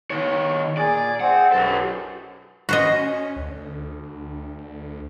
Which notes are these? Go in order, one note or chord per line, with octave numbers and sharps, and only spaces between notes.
D#3 C#5
A#2 G#4 D5
C4 G#4 F#5
B1 F#2 G4 A4
C#4 F#4 C5 D#5
D2